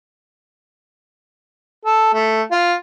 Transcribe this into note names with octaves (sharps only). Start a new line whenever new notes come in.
A4
A3
F4